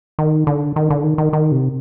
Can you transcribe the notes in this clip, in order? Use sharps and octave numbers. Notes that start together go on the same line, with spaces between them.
D#3
D3
D#3
D3
D#3
D#3
D#3
C3